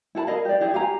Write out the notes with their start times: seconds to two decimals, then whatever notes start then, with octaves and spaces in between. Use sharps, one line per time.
0.15 E4 A4 A5 B5
0.27 G#4 A#4 D#5 F5
0.45 G4 D5
0.61 E4 G4 G#4
0.74 G4 F5 G#5 A#5